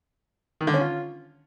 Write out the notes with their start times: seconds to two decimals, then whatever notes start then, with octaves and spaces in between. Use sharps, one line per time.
0.61 D#3
0.67 D3
0.74 C#4
0.80 F4